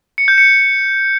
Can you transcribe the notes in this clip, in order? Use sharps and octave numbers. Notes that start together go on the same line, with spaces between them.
C#7
G6
C#7